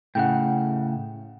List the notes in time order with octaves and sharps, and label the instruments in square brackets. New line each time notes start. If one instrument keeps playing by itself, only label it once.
[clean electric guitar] A2 C#3 [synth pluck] F#5 G5